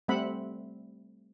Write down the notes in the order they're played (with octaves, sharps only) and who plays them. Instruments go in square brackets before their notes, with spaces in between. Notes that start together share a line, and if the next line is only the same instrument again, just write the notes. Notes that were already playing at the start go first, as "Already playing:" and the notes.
[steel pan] G3 A3 C4 E5 F#5 B5